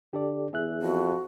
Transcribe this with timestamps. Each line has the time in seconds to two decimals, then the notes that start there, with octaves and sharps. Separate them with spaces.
0.13 D3 G4 A4 D5
0.53 E2 G#4 E5 F#6
0.82 F2 F#4